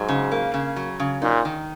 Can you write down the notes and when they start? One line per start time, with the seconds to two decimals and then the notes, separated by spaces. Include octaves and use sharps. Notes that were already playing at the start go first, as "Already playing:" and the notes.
Already playing: G#2 F#3
0.09 C#3
0.32 A#3
0.54 C#3
0.76 F#3
1.00 C#3
1.22 A#2 D#4
1.45 D#3